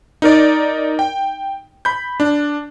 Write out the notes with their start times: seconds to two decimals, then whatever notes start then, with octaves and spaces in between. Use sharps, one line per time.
0.22 D#4 A#4 D5
0.99 G5
1.85 B5 G6
2.20 D4